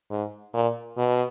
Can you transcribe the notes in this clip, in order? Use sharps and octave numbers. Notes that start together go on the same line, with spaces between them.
G#2
A#2
B2